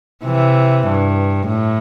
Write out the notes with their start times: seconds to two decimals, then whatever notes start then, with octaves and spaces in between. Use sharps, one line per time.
0.24 C3 E3
0.87 G2
1.49 A2